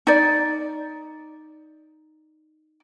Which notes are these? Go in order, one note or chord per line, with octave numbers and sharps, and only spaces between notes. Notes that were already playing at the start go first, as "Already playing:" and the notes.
D#4 D5